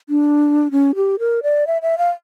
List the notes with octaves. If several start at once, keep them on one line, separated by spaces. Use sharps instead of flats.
D4
C#4
G4
A#4
D5
E5
E5
F5